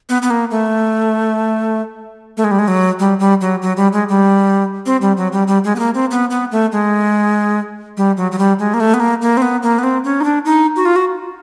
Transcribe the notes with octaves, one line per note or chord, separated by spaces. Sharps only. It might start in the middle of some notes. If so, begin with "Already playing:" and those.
B3
B3
A#3
A3
A3
G#3
G3
G#3
F#3
G3
G3
F#3
F#3
G3
G#3
G3
C4
G3
F#3
G3
G3
G#3
B3
A#3
C4
B3
B3
A3
G#3
G3
F#3
F#3
G3
G#3
A#3
A3
B3
A#3
A#3
C4
B3
A#3
B3
C4
C#4
D#4
D4
D#4
F#4
F4
F#4